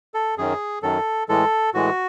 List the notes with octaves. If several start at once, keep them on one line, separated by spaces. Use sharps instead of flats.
A4
F#2 D#3 F#3 G#4
F#2 D#3 F#3 A4
A2 E3 G#3 A4
A2 E3 G#3 F#4